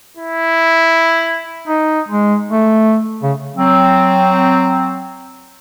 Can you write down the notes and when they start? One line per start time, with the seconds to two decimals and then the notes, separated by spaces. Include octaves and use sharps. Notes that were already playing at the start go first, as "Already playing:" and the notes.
0.17 E4
1.68 D#4
2.09 G#3
2.51 A3
3.23 C#3
3.55 F#3 C4